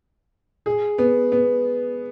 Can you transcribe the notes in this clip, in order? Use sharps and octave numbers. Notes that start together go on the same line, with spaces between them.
G#4
B3
B3